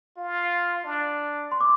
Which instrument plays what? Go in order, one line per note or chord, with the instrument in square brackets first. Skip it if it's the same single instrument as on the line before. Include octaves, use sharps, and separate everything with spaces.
[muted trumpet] F4
D4
[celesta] C6
D6